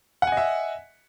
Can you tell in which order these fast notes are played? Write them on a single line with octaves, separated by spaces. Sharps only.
F#5 G#5 D#5 E5